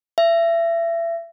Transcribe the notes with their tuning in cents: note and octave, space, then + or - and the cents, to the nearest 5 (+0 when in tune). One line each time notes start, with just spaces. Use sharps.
E5 +30